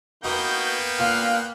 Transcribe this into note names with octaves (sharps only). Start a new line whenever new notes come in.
A#3 B3 D#4 F#4 B4 G5 G6
A#2 F5 F6 F#6